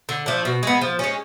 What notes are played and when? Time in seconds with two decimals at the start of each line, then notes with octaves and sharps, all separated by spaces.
0.09 D3
0.26 F3 A3 D4
0.45 B2
0.63 G#3 B3
0.81 F3
0.99 G#3 C#4